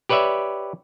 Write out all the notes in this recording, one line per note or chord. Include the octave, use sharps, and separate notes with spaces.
G4 B4 C#5 D5 E5